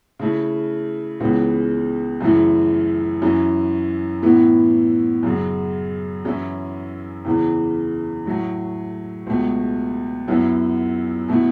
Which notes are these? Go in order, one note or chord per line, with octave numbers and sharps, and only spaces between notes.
C#3 A3 E4
C#2 C#3 E3 B3
F#2 C#3 E3 A3 E4
F#2 E3 C#4 E4
A2 E3 B3 E4
F#2 C#3 F#3
F#2 E3 C#4 E4
E2 C#3 E3
A2 F#3 A3
C#2 B2 A3
F#2 F#3 B3 E4
B2 A3 E4